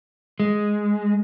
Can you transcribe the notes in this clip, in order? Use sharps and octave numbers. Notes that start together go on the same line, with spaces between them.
G#3